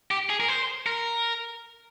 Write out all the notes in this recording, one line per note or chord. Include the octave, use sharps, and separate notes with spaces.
G4
G#4
A#4
C5
A#4